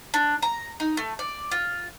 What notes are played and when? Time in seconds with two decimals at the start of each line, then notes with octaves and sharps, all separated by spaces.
0.14 D4
0.42 A#5
0.80 D#4
0.97 A3
1.19 D5
1.51 F4